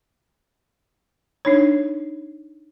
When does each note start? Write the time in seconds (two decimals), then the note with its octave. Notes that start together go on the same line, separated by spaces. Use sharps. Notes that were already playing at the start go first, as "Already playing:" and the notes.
1.45 D4 D#4 C#5